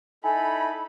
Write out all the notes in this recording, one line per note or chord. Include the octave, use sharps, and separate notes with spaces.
D#4 E4 A4 G#5 B5